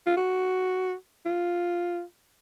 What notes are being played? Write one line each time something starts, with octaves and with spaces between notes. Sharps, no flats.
F4
F#4
F4